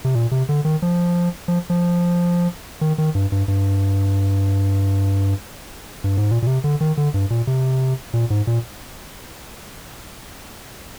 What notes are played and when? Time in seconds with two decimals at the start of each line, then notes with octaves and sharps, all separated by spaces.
0.05 C3
0.15 A#2
0.32 C3
0.49 D3
0.65 D#3
0.82 F3
1.48 F3
1.70 F3
2.81 D#3
2.98 D#3
3.15 G2
3.32 G2
3.48 G2
6.04 G2
6.17 G#2
6.31 A#2
6.42 A#2
6.47 C3
6.64 D3
6.81 D#3
6.97 D3
7.14 G2
7.30 A#2
7.47 C3
8.14 A#2
8.30 G#2
8.47 A#2